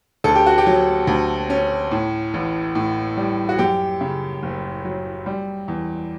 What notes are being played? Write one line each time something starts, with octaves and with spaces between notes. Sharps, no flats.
D2 A4
G4
F#4
G4
F#3
D2
C#4
A2
A1
A2
G3
F#4
F#2 G4
C#3
F#1
F#3
G3
E2